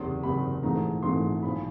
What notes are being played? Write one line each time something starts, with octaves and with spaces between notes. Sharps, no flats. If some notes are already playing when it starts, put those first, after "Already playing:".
Already playing: F#1 E2 C3 C6
F#1 E2 C3 B5
A#1 G#2 E3 A3 A#5
A#1 G#2 E3 A3 C6
B1 A#2 F3 B5